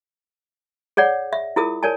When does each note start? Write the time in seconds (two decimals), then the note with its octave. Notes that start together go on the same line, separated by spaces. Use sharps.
0.97 G#4 C#5 D5 F#5
1.33 E5
1.56 E4 F4 G#4 A#4 D#6
1.83 A#4 C#5 D5 G#5 A5